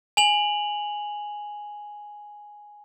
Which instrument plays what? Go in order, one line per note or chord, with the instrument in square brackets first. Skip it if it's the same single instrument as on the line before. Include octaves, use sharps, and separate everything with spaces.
[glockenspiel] G#5 F7 F#7